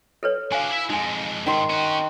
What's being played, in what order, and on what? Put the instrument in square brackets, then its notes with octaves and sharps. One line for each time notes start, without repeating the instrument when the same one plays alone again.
[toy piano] A4 B4 C#5
[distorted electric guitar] D4 F#4 [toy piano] F5 G#5
[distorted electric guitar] E4 E5
[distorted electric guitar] F2 G#3 [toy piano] D#4 G#5
[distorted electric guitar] G#2 [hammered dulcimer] D#3 C6
[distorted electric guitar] C#4 F#4